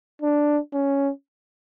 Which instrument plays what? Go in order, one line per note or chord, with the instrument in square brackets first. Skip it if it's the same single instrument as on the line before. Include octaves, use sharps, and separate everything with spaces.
[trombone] D4
C#4